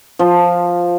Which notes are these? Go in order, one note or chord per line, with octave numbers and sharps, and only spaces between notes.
F3